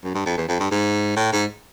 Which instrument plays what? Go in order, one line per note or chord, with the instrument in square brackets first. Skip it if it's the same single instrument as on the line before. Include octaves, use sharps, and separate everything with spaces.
[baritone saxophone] F#2
G2
F2
E2
F2
G2
G#2
A2
G#2